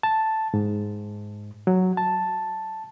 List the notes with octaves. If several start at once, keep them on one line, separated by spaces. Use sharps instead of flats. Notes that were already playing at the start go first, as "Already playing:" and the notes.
A5
G#2
F#3
A5